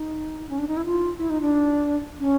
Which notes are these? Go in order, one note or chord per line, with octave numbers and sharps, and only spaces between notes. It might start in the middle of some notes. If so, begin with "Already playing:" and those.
Already playing: D#4
C#4
D4
D#4
E4
F4
E4
D#4
D4
C#4